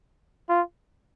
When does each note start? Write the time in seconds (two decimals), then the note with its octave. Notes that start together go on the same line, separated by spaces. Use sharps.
0.49 F4